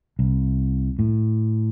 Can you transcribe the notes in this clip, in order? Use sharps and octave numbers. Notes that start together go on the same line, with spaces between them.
C2
A2